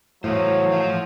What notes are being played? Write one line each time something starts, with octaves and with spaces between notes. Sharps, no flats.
A2 E3 F#3 C5
F3 F5